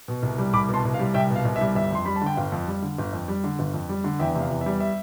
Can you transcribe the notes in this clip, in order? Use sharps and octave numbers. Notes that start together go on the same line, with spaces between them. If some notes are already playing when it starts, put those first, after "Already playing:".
B2
C2
G3
C2 B5 D6
B2
A5 C6
C2
F5
G3
C2 E5 G5
B2
F5
C2
E5
G3
G1 E5
F2 C6
G3 B5
A5
D3 G5
G1 F5
F2
G3
D3
G1
F2
G3
D3
G1
F2
G3
D3
E2 E5 G5
C3
F5
E2
E5
G3
E5